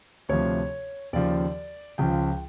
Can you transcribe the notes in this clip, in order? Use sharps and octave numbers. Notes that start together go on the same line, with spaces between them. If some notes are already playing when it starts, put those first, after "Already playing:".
D2 C3 F3 C#5
D#2 C#3 F3 D5
C#2 C#3 F3 G5